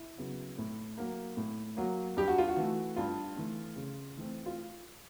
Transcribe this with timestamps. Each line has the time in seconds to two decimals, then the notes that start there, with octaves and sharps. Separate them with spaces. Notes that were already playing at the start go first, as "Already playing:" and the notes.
Already playing: E4
0.17 C#3 F#3 B3
0.58 A2
0.98 F#3 A#3
1.37 A2
1.77 F#3 A#3
2.17 G2 G4
2.28 F#4
2.38 F4
2.48 F#4
2.57 E3 A3
2.96 G2 F4
3.36 E3 A3
3.76 C#3
4.17 E3 A3 C4
4.46 F4